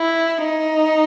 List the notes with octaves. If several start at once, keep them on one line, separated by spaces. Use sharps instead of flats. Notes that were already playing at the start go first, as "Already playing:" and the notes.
Already playing: E4
D#4